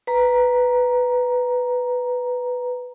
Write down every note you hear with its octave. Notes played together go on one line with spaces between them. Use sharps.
B4 A#5